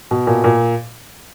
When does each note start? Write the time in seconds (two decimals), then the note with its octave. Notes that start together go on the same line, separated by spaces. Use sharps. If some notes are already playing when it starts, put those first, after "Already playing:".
0.11 B2
0.27 A#2
0.44 A#2